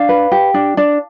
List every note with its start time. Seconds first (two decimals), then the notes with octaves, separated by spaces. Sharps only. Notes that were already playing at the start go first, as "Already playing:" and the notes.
Already playing: D4 F5
0.09 B4
0.32 G4
0.54 D4
0.77 D4